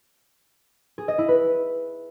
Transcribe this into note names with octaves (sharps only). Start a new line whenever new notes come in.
G#4
D#5
E4
B4